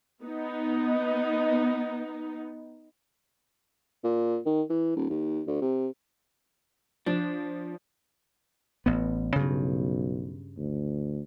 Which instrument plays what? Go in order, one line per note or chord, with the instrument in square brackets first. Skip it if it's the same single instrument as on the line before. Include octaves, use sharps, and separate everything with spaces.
[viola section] B3 D#4
[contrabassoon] A#2
D#3
E3
D#1
D#2
D2
C3
[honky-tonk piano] F3 [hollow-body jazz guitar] D4
[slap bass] A1 B3
[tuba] B1 [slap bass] G2 C#3
[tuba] D2